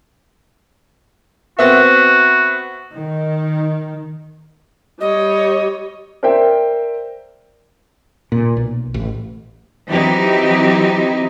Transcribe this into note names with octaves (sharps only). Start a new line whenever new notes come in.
B3 C4 F#4 E5
D#3
G3 C#5 D#5
A#4 C5 D5 E5 G5
A#2
B1
A1
E3 F#3 C4 D#4 E4 G4